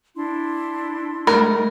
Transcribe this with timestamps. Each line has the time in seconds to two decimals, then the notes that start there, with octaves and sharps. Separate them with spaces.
0.15 D4 E4 C6
1.27 G#3 A3 A#4 B5